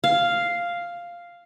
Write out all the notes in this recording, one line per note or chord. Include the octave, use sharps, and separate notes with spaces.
F5